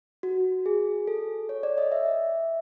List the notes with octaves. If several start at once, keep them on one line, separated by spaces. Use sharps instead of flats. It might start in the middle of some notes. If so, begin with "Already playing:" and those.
F#4
G#4
A4
C#5
D5
D#5
E5